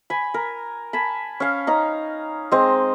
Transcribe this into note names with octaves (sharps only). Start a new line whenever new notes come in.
G#5 B5
A#4
G#5 A5 B5
C#4 F5
C#4 D#4 A#5
G#3 C4 D#5